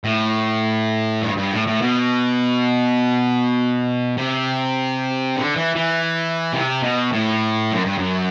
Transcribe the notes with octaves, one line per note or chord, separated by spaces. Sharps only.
A2
G2
G2
A2
A2
B2
C3
D3
E3
E3
C3
B2
A2
F#2
G2
F#2